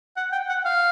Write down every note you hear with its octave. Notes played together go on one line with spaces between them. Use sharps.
F#5
G5
F#5
F5